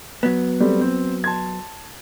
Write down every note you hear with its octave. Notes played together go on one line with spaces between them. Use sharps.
F#3 B3
G3 A3 C4
C4
A5 C6 G#6